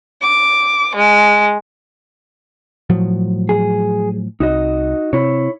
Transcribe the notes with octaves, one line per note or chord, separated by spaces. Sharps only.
D6
G#3
A2 F3 F#3
G#4
C2 D#4 F#4 D#5
C3 E4 C#5